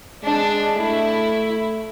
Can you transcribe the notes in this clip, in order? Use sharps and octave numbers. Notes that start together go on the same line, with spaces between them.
G#3 D4
A3 E4